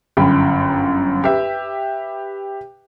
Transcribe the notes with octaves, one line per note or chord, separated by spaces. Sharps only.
G1 F#2 G5 B5
G4 B4 E5